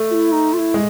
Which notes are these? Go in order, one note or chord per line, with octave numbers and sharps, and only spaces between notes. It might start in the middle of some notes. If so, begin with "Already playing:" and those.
Already playing: A3
F4
E4
D#4
F4
E4
G#3